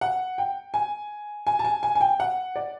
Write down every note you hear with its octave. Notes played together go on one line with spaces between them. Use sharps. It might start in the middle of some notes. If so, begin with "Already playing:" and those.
F#5
G5
G#5
G#5
A5
G#5
G#5
G#5
G5
F#5
D5